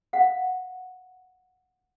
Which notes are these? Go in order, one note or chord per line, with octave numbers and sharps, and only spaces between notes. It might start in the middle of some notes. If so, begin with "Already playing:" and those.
F5 F#5